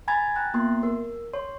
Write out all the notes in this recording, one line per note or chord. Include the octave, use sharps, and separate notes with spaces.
G#5 A#5 B5 G#6 A6
G5 A#5 F#6 A6
A#3 B3 F4 C6
A#4
C#5 C6